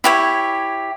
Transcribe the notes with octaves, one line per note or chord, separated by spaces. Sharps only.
E4 G4 C#5